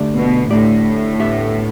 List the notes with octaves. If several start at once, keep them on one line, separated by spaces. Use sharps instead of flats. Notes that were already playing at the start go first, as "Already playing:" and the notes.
Already playing: D2 D3 A3 G4 D5
B2
D2 A2 D3 A3 G4 D5
D2 D3 B3 G4 E5